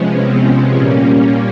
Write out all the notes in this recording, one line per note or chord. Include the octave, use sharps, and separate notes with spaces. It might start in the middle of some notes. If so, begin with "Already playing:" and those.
Already playing: C3 F3 G#3 B3 C#4
C4
A#2 G3 A#3 C#4